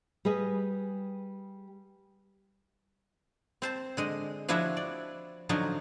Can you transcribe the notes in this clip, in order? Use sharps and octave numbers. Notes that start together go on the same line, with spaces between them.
G3 G#4 B4 D#5
C4 C5 A5
D3 G#3 D#5
F3 D4 E4 F#4 C#5 E5
D5
D3 F3 F#3 C#4 D#4